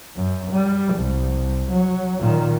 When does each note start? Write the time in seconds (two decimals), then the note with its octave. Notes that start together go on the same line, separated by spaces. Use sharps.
0.16 F#2
0.51 G3
0.94 C2
1.71 F#3
2.20 A#2 D#3